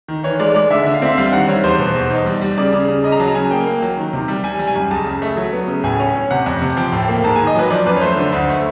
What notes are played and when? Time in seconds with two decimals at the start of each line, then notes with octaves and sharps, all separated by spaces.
0.08 D#3
0.23 E3 C#5
0.40 G#3 D5
0.55 G#3 D5
0.70 D3 E5
0.83 E5
0.86 D3
0.94 F5
1.02 C4 E5
1.17 G3 F5
1.33 D#3 F#5
1.48 G3 C#5
1.64 E2 C5
1.79 B2
1.95 E2
2.10 D#4
2.26 G3
2.41 G3
2.58 C#3 D5
2.73 C#3
2.89 C#3
3.04 C#3 D#5
3.12 A#5
3.20 F#3 A5
3.35 C#3 G#5
3.51 A#3 G5
3.66 A#3
3.82 F#3
3.97 D#3
4.13 C3
4.28 G3
4.44 G3 G#5
4.59 G3
4.67 G#5
4.75 F#2
4.91 C#2 A5
5.06 C#3
5.22 A3
5.37 F#3
5.53 B3
5.68 C#3
5.84 A2 G#5
6.00 C#4
6.15 C#4
6.31 C3 F#5
6.46 F2
6.62 C3
6.77 F3 G5
6.92 A2
7.08 A#3
7.24 G#2 A5
7.36 G#5
7.39 D#3
7.47 D#5
7.55 F#3 B4
7.70 F3 D5
7.86 F#2 B4
7.96 C#5
8.02 A3 C5
8.17 D3
8.32 D2
8.49 A3